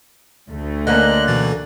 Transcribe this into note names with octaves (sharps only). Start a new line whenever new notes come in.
D2 A3
D3 A#3 C#4 D#5 F#6
B2 E3 A6